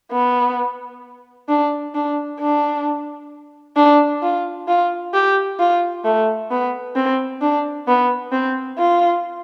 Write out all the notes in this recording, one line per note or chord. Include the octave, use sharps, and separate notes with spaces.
B3
D4
D4
D4
D4
F4
F4
G4
F4
A3
B3
C4
D4
B3
C4
F4